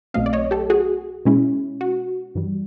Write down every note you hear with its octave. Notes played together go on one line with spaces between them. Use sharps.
B1 B2 F#3 A3 C4 D#5 F5
D5
C#5 D#5
G4 A4
F#4 G#4
B2 G#3 C#4 E4
F#4
G2 E3 G3